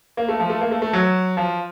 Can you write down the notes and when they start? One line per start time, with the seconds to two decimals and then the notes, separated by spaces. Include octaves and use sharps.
0.17 A#3
0.29 A3
0.40 F3
0.50 A3
0.61 A#3
0.71 A3
0.82 A3
0.93 F#3
1.37 F3